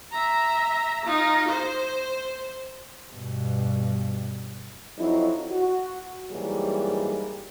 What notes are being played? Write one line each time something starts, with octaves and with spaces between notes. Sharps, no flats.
E5 A#5
D#4 F4
C5
G2 B2
F2 F#3 D#4 E4
F#4
G#2 E3 F#3 G3 A#3 G#4